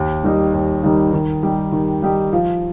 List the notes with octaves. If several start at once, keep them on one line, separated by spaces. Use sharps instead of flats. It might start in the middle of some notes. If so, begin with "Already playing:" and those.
Already playing: D#2
D#3 G3 D#4
D#2
D#3 G3 D#4
D#3
G3 D#4 G4
D#3
G3 D#4 G4
F3